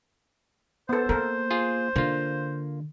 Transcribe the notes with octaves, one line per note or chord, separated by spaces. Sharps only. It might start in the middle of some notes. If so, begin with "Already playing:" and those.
B3 A4 C5
A#3 A4 A#4
F4 G#4
D3 A#3 F4